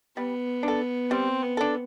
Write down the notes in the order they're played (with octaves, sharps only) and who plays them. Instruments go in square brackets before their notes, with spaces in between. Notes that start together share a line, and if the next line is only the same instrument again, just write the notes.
[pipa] G3 [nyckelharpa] B3
[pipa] D4 A4
[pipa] G3 [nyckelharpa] C4
[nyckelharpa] B3
[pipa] D4 A4